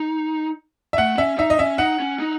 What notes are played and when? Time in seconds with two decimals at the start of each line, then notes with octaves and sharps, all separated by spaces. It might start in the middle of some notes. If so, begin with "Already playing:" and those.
Already playing: D#4
0.93 E5
0.98 A3 F#5
1.17 C#4 E5
1.38 D#4 E5
1.50 D#5
1.59 C#4 E5
1.78 D#4 F#5
2.00 C#4
2.19 D#4